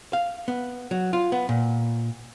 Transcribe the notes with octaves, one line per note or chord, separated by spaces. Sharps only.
F5
B3
F#3
F4
B3
A#2